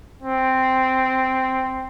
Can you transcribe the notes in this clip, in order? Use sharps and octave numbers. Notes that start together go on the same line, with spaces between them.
C4